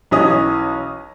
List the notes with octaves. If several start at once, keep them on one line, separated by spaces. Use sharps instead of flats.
B1 E3 C#4 D#5